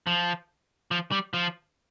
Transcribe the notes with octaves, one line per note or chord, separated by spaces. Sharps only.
F3
F3
G3
F3